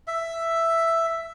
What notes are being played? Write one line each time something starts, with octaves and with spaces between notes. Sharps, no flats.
E5